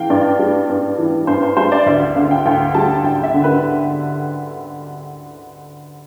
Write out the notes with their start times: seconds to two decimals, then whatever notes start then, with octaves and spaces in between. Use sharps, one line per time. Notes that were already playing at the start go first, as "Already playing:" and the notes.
Already playing: E3 F5 G5
0.10 G2 D5
0.39 G3
0.69 G2
0.98 E3
1.27 G2 C5
1.43 C5
1.57 G3 C5
1.72 D5
1.86 D2 E5
2.01 F5
2.16 D3 F5
2.31 G5
2.46 D2 G5
2.74 G3 A5
3.04 D2 G5
3.23 E5
3.34 D3
3.44 B4